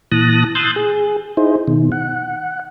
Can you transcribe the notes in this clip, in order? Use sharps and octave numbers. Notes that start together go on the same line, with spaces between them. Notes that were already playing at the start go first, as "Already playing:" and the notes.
A#2 E3 A5 D#6 F#6 A#6
C6 D#6 E6 F#6 G6 A6
G#4
D#4 E4 G#4 C5
B2 D#3
F#5